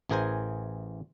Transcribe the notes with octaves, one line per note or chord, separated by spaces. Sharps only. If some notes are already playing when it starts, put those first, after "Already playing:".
A1 E3 G#4 A#4 C5 G#5